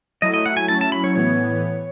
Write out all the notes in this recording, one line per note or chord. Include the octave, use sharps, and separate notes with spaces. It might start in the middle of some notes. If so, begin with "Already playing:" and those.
F#3 A3 E4 D#5
D#5
F#5
G#5
F#3 C#4 E4 A5
A5
B5
C#5
A2 E3 B3 C#5